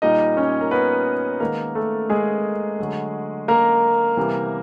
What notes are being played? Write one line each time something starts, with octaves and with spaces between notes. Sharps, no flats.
A#2 G3 A#3 D#4 D#5
C#4 C#5
A#4
B3 B4
D#3 G#3 A#3 B3 A#4
A3 A4
G#3 G#4
D3 F#3 A3
A#3 A#4
C3 E3 G3 B3